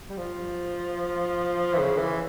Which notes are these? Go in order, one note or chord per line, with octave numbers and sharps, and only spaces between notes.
G3
F3
E3
C#3
E3